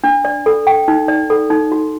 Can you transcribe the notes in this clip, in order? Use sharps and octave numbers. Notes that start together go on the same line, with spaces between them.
D4
D5
A4
G5
D#4
D5
A4
D#4
F#4